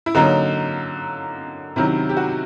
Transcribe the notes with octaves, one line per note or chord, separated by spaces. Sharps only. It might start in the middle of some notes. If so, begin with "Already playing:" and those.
E4
D3 F#3 A#3 C#4 D#4
C3 D#3 F#3 E4
G4
F#4